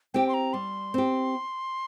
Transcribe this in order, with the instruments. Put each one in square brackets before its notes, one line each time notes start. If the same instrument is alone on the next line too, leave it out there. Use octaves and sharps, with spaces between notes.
[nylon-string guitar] C4 G4 [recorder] G5
[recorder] C6
A#5
[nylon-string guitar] G3 [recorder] C6
[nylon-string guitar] C4 G4